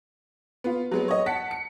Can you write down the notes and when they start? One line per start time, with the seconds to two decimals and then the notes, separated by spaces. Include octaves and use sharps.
0.64 B3 F4
0.91 F#3 G#3 B3
1.08 C#5 D#5
1.26 F#5 A5 B6 C#7
1.51 C#7